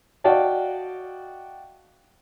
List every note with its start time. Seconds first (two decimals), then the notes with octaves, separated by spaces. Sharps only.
0.24 F#4 D5 D#5 F5 G5 A5